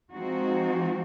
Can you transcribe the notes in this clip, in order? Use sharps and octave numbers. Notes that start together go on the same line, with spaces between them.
F3 G#3 C4 D#4 F#4